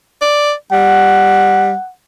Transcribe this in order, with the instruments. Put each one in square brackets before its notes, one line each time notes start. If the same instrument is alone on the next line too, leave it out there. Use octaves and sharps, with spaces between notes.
[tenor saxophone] D5
[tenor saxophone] G3 [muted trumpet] F#5